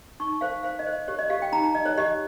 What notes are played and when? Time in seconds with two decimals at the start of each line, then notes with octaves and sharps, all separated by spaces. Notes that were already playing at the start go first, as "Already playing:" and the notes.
0.20 D#4 C#6
0.41 C5 F5
0.63 C5 F5
0.79 D#5
0.86 C5
0.93 D#5
1.08 G4 C#5
1.19 D#5
1.30 G4 F5
1.42 G5
1.52 D#4 A#5
1.64 A#5
1.74 D#4 D#5
1.86 C#5
1.98 G4 D#5